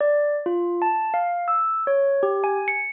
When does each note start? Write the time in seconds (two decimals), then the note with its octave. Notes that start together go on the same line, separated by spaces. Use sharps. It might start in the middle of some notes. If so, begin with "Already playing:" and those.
0.01 D5
0.46 F4
0.82 A5
1.14 F5
1.48 E6
1.87 C#5
2.23 G4
2.44 G#5
2.68 C#7